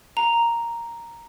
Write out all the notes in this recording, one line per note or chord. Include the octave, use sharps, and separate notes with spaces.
A#5